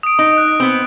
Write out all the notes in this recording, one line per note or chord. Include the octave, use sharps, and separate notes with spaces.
D#6 D7
D#4
F#6
B3 C4